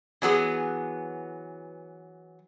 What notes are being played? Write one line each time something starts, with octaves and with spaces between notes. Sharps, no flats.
E3 F#3 B3 G#4